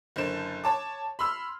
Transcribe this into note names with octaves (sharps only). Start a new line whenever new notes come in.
F#1 D3 C5 E7
C#5 A5 D6
B5 C6 E6 F6